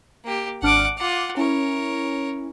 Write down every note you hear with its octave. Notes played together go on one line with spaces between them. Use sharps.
A#3 G4
G#1 D4 F#5 D6 F6
F4 F#5 D6
C#4 E4 A#4 C#5